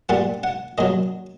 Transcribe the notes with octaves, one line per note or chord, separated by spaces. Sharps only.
A#2 G3 F#5
F#5
A#2 F#3 D#5